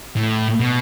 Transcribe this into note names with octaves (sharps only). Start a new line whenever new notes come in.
A2
B2